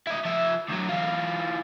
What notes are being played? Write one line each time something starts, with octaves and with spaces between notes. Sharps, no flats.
E4 D#5
F3 E5
D2 F#3
E3 F4